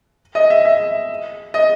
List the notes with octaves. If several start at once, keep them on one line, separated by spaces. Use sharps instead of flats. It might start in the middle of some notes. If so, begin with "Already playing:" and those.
D#5
E5
E5
D#5